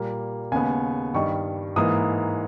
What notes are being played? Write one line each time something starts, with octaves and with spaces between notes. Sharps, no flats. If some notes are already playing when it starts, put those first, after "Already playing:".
Already playing: A#2 G3 A#3
D#2 C#3 G#3 B3 G#5
G2 D#3 G3 C#6
G#2 E3 A#3 D#6